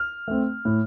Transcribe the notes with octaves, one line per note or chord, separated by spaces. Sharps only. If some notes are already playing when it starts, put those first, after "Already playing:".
Already playing: F6
A3 C4
A2